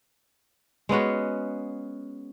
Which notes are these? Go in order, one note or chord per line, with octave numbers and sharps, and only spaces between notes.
G#3 B3 C#4 F#4